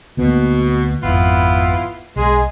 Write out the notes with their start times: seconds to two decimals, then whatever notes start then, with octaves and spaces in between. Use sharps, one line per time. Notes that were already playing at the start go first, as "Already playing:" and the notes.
0.17 D2 B2 A#3 B3
1.03 G#1 F2 B3 E4 F4
2.16 B1 G#3